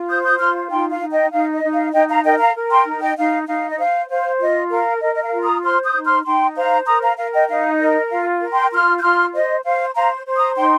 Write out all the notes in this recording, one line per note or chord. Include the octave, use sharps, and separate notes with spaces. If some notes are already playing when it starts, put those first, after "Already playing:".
Already playing: F4
C5 D#6 G6
D#6 G6
F4 C6 F6
D#4 G5 C6
F5
D#4
D#5 G5
D#4 F5
D#5
D#4
F5
D#4 D#5 G5
F5 A#5
A#4 D#5 G5
F5 A#5
A#4
G5 C6
D#4
D#5 G5
D#4 F5
D#4 F5
D#5
C5 F5
C5 F5
F4 D#5
A#4 F5
A#4 D#5
D#5
F5
F4
A#5 D#6
C5 C6 F6
D#6 G6
D#4
C6 F6
D#4 G5 C6
C5 F5 A#5
A#4 A#5 D#6
F5 A#5
A#4 F5
D#5 G5
D#4 F5
A#4 D#5
F4 F5
A#4
G5 C6
F4 C6 F6
G6
F4 C6 F6
C5 D#5
C5 F5
C5 F5 A#5
C5
A#5 D#6
D#4 G5 C6